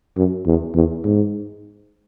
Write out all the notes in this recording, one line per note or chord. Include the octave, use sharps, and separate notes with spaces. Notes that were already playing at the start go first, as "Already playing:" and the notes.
F#2
E2
E2
G#2